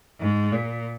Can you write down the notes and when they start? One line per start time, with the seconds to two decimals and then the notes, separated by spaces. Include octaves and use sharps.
0.20 G#2
0.52 A#2